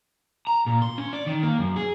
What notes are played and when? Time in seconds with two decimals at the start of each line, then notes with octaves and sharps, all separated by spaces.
0.47 A#5
0.66 A#2
0.82 C6
0.98 C#4
1.13 D5
1.27 D#3
1.43 A#3
1.59 F#2
1.76 G#4